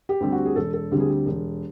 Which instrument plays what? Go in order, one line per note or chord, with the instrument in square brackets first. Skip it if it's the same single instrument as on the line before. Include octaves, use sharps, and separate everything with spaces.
[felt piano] G4
D2 D3 G3 C4
F#4
G#4
E1 A4
A4
D2 D3 G3 C4
G#4
G4
E1